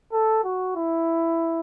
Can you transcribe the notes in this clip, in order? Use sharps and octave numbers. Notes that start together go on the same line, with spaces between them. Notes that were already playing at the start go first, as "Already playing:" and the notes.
A4
F#4
E4